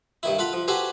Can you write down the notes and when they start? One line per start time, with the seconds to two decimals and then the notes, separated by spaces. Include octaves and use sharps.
0.23 G2 D#3 E4
0.39 F4 A4 F#5 B5
0.53 F3
0.68 F#4 G4 A4 B4 C5 G#5